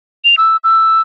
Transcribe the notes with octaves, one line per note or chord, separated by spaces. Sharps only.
F7
E6
E6